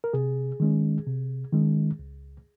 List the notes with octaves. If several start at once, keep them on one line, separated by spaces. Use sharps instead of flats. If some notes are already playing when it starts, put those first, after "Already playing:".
A#4
C3 G#4
D#3 G#3 C#4
C3
D#3 G#3 C#4
C#2